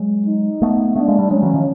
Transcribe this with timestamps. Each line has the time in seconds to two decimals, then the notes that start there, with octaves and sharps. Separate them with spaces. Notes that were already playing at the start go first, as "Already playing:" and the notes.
Already playing: F#3 G#3
0.26 D#4
0.62 A3 B3
0.95 A3 B3 D4
1.08 G#3 A#3
1.19 G3 A3
1.30 F#3 G#3 C#4
1.42 E3 F#3
1.54 D#3 F3